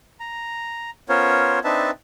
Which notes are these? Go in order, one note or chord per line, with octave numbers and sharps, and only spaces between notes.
A#5
B3 C#4 F4 A#4 C5 C#5
C4 D4 D#4 B4 E5 A5